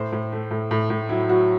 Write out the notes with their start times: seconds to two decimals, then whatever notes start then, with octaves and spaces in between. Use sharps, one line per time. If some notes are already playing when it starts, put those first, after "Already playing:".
Already playing: A2 C5
0.12 A2
0.33 A3
0.51 A2
0.71 A2
0.90 A2
1.09 F#3 E4
1.29 F#3 F#4